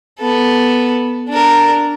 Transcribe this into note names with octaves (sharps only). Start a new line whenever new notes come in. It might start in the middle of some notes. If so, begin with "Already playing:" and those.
B3 A4
D4 A#4